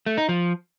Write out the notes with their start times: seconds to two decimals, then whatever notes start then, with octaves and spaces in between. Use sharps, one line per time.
0.06 A3
0.18 D#4
0.29 F3